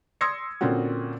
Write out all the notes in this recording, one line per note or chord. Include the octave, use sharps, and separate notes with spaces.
C6 D#6 E6 G#6 A#6 C#7
A#2 D3 C4 C#4 F4 F#4